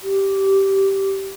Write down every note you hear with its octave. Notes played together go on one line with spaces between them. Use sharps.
G4